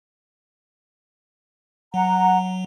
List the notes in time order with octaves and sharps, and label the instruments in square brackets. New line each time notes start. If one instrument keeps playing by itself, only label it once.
[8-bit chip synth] F#3 [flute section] F#5 A#5